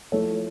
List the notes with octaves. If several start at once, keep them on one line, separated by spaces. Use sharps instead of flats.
F3 A3 E4 A4 C#5